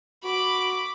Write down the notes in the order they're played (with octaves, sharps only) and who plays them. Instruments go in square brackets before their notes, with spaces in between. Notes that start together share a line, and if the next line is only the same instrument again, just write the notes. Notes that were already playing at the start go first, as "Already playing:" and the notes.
[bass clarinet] F#4 [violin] B5 D6